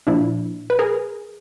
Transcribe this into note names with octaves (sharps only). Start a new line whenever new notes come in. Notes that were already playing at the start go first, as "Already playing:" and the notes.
A#2 F3 D4 E4
B4
G#4 A#4